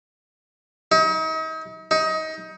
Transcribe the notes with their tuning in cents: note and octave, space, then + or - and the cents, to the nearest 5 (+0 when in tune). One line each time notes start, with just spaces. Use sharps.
D#4 +40
D#4 +25